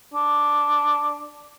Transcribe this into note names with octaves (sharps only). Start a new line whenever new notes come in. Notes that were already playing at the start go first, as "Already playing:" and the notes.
D4